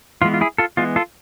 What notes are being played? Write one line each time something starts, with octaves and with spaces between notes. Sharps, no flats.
E3 G#3 B3 F4
F4
E4 G#4
F4 A4
E3 G#3 B3 F4
F4 A4